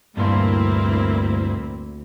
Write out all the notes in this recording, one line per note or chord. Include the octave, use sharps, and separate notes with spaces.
D2 G2 A#2 A#3 C4 E4 C6